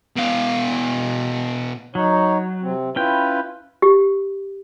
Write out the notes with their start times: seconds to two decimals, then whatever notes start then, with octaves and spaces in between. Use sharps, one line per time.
0.17 B2 F5
1.95 F#3 D#4 C#5
2.62 C3 C4
2.96 C#4 E4 F4 B4 G5
3.82 G4